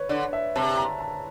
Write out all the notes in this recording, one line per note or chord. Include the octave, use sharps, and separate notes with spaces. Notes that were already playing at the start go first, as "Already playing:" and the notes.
Already playing: B4 C#5
D3 D5
E5
C3 A5
A#5
A5